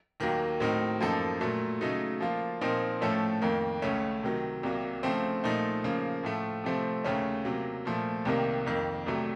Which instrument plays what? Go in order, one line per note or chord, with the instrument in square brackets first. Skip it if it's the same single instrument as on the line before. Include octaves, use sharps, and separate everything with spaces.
[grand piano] D#2 D#3 F#3 A#3
A2 F#3 C4 D#4 A#4
F#2 F3 A#3 D#4 A4
A#2 F#3 A3
C#3 F#3 A3 D#4
F3 A#3 F4
A#2 F3 C4 D#4 A#4
A2 F3 A3 C#4 A4
F2 D#3 A#3
C#2 C#3 A3 C#4
C3 D#3 F#3
C2 C3 F#3 A#3
C#3 F3 A3 C4
A#2 F3 A3 D#4
C#3 F3 A#3
A2 F3 A3
C3 F3 A3 C4
D#2 C#3 A3 C#4
C3 F#3 A#3
A#2 F3 A3
C2 C3 D#3 A#3
F2 D#3 A#3
C2 C3 F#3 A3